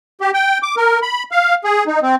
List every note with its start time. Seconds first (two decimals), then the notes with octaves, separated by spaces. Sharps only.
0.21 G4
0.34 G5
0.63 D6
0.77 A#4
1.02 B5
1.32 F5
1.64 G#4
1.87 D#4
2.03 C4